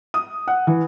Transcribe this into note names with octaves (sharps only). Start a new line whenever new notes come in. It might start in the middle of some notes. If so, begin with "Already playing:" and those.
D#6
F#5
E3